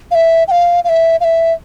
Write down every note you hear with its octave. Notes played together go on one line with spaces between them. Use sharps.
F5
E5
G5
F5
F5
E5
F5
E5